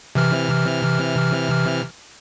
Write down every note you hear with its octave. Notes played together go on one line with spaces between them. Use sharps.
C3 E3 F6